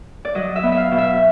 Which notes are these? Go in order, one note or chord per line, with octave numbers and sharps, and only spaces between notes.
D5
F#3 D#5
E5
B3
E5
F5
B2
E5